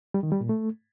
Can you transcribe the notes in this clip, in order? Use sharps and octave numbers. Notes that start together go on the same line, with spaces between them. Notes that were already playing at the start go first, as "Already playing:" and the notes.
G3
D#3
G3
A#2
A3